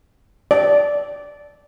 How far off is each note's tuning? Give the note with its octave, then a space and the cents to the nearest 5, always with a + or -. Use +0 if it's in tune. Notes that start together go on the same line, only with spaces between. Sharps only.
D5 -10